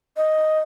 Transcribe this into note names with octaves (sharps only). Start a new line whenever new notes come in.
D#5